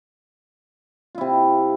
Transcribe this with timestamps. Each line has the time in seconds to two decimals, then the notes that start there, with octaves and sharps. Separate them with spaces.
1.15 F4
1.18 E4
1.21 C3